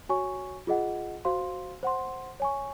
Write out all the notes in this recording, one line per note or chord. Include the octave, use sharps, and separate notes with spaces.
F#4 C#5 G#5 C#6
F4 G#4 D#5 F#5
F#4 C5 F5 C6
C5 F#5 C6
C#5 G#5 C#6